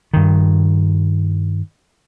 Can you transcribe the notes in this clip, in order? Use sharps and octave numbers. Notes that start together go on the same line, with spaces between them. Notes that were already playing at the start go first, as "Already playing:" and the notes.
G2 D#3